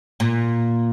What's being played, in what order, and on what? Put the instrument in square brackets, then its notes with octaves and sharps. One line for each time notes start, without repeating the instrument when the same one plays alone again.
[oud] A#2